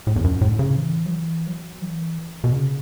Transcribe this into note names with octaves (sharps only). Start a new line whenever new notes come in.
A2
E2
F#2
A2
C#3
E3
F#3
E3
F#3
E3
B2
C#3